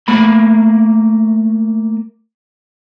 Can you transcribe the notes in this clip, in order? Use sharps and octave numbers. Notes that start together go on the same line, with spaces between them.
A3 A#3 B5